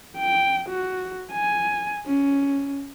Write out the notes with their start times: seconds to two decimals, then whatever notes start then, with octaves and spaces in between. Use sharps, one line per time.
0.17 G5
0.70 F#4
1.32 G#5
2.06 C#4